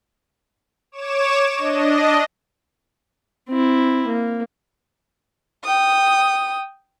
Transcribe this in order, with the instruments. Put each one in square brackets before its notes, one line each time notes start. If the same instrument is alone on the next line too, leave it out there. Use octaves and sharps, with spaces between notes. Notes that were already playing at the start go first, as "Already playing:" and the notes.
[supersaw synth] C#5 D6 E7
D4 D#5
[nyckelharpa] C4 E4
A#3
[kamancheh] G5 D#6